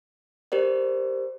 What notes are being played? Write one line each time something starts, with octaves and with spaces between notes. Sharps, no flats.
G4 A#4 C5 D5